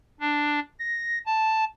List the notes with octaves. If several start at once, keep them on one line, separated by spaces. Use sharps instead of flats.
D4
A#6
A5